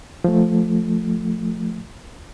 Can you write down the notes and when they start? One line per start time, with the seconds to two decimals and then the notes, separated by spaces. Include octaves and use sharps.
0.24 F3 A3